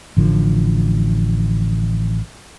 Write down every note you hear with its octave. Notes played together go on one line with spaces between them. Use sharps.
A1 D3 F3